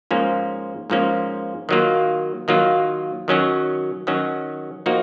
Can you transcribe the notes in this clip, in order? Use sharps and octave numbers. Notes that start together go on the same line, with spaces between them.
G#2 F3 A#3 C#4
G#2 F3 A#3 C#4
D#3 F#3 A#3 F4
D#3 F#3 A#3 F4
D#3 F#3 C#4 F#4
D#3 F#3 C#4 F#4
F3 A#3 D#4 F#4